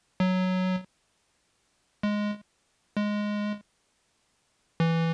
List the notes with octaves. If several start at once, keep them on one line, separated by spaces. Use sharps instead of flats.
F#3
G#3
G#3
E3